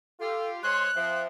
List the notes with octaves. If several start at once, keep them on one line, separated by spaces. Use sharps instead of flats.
F4 G4 A4
G#3 C5 C#5 C6 F#6
F3 C4 E5